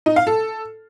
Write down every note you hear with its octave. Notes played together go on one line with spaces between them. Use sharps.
D#4
F5
A4